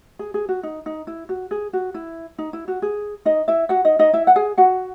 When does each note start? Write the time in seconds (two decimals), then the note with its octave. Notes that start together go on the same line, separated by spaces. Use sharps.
0.19 G#4
0.34 G#4
0.49 F#4
0.63 D#4
0.86 D#4
1.07 E4
1.29 F#4
1.51 G#4
1.73 F#4
1.94 E4
2.38 D#4
2.53 E4
2.68 F#4
2.82 G#4
3.25 D#4 D#5
3.48 E4 E5
3.69 F#4 F#5
3.85 D#4 D#5
3.99 D#4 D#5
4.13 E4 E5
4.27 F#5
4.36 G#4 G#5
4.58 F#4 F#5